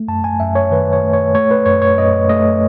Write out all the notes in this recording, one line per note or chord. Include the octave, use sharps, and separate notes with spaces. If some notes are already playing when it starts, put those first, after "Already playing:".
Already playing: A3
F#2 A5
G#5
F#2 E5
C#5
D#3 B4
C#5
A3
C#5
A3 C#5
B4
F#2 C#5
C#5
F#2 D#5
A3 D#5